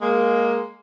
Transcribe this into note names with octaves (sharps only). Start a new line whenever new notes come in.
G#3 A#3